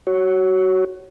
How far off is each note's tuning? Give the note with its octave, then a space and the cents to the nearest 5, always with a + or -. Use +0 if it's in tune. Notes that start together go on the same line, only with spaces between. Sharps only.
F#4 +20 C#5 +0